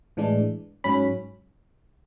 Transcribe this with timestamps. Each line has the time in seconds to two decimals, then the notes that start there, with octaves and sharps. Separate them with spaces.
0.17 A2 E3 G#3 D4
0.84 G#2 F#3 C#4 B5